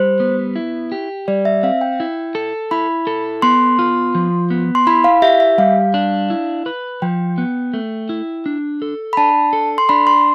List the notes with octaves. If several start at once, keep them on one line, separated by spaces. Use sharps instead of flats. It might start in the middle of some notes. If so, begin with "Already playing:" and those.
Already playing: G3 C5
B3
E4
G4
G3 D5
E5
C4 F5
G5
E4
A4
E4 B5
A4
B3 C6
F4
F3
B3
C6
E4 B5
F5
G4 E5
E5
G3 F5
D4
E4
B4
F3 G5
B3
A3
E4
D4
A4
B5
D4 A5
A4
C6
D4 B5
C6